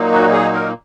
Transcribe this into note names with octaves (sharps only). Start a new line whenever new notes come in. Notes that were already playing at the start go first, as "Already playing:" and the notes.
Already playing: A#2 F#3 A#3 D#4
F#4
G#4
A#4